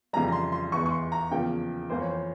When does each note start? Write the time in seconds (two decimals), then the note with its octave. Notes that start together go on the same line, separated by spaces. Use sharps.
0.13 F2 C#3 E3 G3 A#5
0.28 A#5
0.32 C6
0.52 C6
0.72 E2 E3 G#3 C#6
0.86 C#6
0.91 C6
1.12 A#5
1.31 E2 C#3 F3 A#3 G5
1.89 F2 E3 A#3 C5
2.00 C#5
2.10 C5